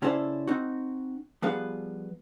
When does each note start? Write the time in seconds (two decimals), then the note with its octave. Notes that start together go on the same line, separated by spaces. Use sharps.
0.02 C#3 C#4 E4 A4 C5 D5
0.47 C4 D#4 F#4
1.42 F3 G3 B3 G#4 B4 F5